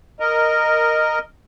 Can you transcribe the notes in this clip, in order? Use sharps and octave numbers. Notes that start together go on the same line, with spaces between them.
A#4 D#5